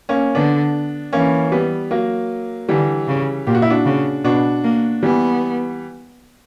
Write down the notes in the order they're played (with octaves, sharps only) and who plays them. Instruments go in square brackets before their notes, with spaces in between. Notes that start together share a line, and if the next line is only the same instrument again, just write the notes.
[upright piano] A#3 C#4
[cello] D3 [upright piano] B3 D4
[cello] E3 [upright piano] A#3 C#4
[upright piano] G3 B3
F#3 A#3
[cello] D3 [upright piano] E3 G3
[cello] C#3
[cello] A#2 [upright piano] G4
[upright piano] F#4
E4
D4 F#4
[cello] C#3
[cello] B2 [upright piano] D4 F#4
[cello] A#3
[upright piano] E3 G3 [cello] B3